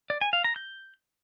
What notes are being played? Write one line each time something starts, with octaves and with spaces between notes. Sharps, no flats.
D5
G#5
F5
A#5
G6